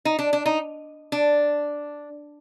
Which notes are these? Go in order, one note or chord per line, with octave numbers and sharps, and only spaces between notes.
D#4
D4
D4
D#4
D4